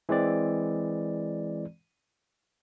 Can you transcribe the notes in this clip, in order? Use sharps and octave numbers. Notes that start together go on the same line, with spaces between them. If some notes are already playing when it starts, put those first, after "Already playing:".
E3 G#3 C4 D5